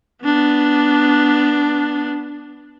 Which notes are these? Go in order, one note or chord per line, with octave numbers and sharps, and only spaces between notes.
B3 D4